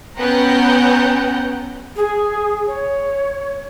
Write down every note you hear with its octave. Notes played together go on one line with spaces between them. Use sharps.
B3 C#4 F#5 G5 A#5 G6
G#4
C#5